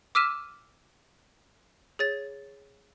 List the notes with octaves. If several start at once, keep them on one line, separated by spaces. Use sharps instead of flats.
D6 E6 F6 B6 D#7 E7
G#4 C#5 A6